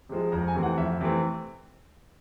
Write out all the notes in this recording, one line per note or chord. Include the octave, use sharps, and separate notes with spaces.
C3 F3 G#3
F2 A#5
G#5
C3 E3 A3 C4
F#5
F2 E5
C3 E3 A3 C4